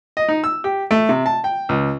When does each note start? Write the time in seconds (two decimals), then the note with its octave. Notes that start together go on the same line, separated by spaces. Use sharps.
0.17 D#5
0.29 D#4
0.44 E6
0.64 G4
0.91 A3
1.09 C3
1.26 A5
1.44 G5
1.69 C#2